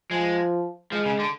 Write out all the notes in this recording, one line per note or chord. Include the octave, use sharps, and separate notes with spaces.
F3 G#3
F3 G#3
C#3
D3